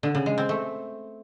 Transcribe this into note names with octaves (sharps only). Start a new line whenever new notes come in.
D3
C#3
G#3
C4
A3